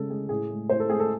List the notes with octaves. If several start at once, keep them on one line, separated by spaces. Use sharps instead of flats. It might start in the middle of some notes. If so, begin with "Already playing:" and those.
Already playing: C#3 G#3 A4
G#3 G#4
A2 G#4
G#3
A2 C5
A4
G#3 G#4
A4